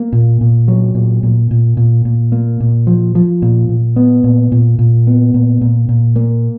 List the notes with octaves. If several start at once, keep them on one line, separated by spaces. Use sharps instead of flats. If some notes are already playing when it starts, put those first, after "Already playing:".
Already playing: A#3
A#2
A#2
F#3
A#2
A#2
A#2
A#2
A#2
A#3
A#2
F3
F3
A#2
A#2
B3
A#2
A#2
A#2
B3
A#2
A#2
A#2
A#3